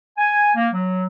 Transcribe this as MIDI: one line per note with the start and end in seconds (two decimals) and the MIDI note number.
0.18 0.50 80
0.56 0.68 58
0.73 1.06 54